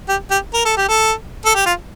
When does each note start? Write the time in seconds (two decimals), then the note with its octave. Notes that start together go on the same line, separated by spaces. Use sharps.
0.09 G4
0.31 G4
0.54 A#4
0.65 A4
0.77 G4
0.89 A4
1.45 A4
1.55 G4
1.66 F4